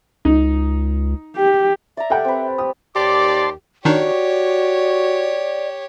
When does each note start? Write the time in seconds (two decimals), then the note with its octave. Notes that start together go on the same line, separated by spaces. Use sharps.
0.25 C#2 D#4
1.37 G4
1.97 D5 E5 A#5
2.10 G4 A4 F#5 G5
2.25 C4 B4
2.58 G4 D#6
2.96 D#2 G4 C5 D5 A5 C6 D6
3.85 D#3 D4 D#4 F#4 G4 C#5 D5